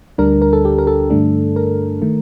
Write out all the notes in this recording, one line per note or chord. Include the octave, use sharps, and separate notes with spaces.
D2 D3 G3 D4 A#4
A#4
A4
G4
A#4
A4
G2 D3 A3 D4
A#4
D#3 A3